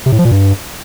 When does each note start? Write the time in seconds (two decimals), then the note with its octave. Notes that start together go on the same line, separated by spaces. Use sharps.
0.06 C3
0.12 A2
0.19 F3
0.25 A#2
0.31 G2